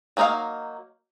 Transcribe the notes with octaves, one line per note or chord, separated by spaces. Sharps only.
F#3 A#3 D#4 G#4 F5